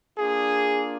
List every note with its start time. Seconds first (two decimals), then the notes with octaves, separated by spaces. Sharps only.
0.18 A#3 D4 F4 G#4